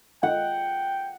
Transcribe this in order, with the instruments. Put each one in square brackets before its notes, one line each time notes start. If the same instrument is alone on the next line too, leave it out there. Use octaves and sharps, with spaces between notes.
[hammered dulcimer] F#5 [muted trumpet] G5